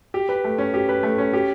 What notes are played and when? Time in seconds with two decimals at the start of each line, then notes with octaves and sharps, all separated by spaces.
0.14 G4
0.29 B4
0.44 A3
0.58 C#4
0.74 G4
0.89 B4
1.03 A3
1.18 C#4
1.33 G4